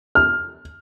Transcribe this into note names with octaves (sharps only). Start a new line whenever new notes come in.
F6